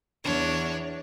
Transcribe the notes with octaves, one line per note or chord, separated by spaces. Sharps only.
E2 D4 C#5